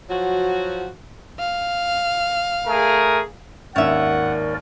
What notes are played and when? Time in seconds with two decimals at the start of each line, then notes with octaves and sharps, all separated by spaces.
0.10 F3 F#3 F#4
1.40 F5
2.67 A3 G#4 A#4
3.76 G#1 D#2 C#4 A#4 D5 E5 F#5